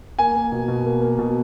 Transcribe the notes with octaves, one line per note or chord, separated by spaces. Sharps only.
A#3 G#5
A#3
B2
B2
A#3
A#3
B2